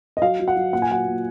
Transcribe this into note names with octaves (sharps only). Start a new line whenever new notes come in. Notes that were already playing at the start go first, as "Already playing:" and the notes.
D#5
F#3 F5
F#3
F#5
F#3
A#2 F#5
G#5
F#3 F#5
A#2